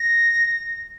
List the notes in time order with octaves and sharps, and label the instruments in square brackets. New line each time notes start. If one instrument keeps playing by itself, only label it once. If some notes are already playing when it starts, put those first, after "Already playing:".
Already playing: [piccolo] A#6